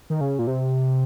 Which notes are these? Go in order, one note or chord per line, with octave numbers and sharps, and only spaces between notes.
D#3
C#3
A#2
C3